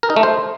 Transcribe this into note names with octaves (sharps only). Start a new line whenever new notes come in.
A#4
D#4
A3
C5